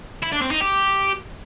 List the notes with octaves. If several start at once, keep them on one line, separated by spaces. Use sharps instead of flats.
E4
D4
C4
D#4
G4